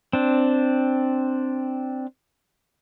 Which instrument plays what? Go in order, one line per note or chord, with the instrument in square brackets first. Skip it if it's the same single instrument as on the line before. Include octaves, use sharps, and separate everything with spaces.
[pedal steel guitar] C4 D4